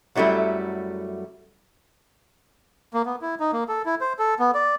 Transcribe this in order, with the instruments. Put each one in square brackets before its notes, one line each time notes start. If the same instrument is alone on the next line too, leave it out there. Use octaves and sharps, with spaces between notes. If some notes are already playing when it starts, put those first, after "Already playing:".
[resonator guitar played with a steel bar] F#2 F#3 G3 A3 E4
[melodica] A#3
B3
E4
D#4
A#3
A4
E4
C5
A4
B3
D5